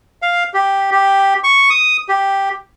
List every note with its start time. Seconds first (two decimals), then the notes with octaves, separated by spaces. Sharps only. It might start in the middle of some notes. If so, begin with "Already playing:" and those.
0.22 F5
0.54 G4
0.92 G4
1.44 C#6
1.70 D#6
2.09 G4